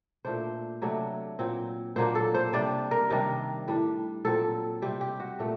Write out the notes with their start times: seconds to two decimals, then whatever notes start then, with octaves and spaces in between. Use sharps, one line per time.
0.25 A#2 A3 D4 C5
0.82 C3 F#3 A3 D4
1.39 A#2 F#3 C4
1.96 A#2 F#3 A#3 D4 C5
2.15 A4
2.35 C5
2.53 C3 G3 D4 D5
2.91 A#4
3.10 C3 D#3 G3 D4
3.68 A2 G3 D4
4.25 A#2 F#3 C4 A4
4.82 C3 G3 C4 G4
5.01 G4
5.20 F#4
5.39 A#2 A3 D4